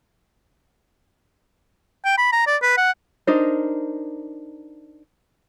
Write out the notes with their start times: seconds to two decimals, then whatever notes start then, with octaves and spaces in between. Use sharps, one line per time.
2.04 G5
2.18 B5
2.32 A#5
2.47 D5
2.62 B4
2.77 F#5
3.27 D4 D#4 A#4 C5